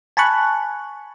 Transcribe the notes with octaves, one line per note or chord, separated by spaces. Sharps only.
G#5 A5 B5 C#6 F#6